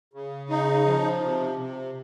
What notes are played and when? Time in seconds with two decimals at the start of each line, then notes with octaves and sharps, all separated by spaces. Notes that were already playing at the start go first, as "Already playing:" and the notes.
0.13 C#3
0.50 D#4
0.86 F3
1.22 C3
1.58 C3